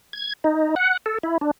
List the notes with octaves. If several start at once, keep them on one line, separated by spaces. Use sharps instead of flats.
G#6
D#4
F#5
A4
E4
D4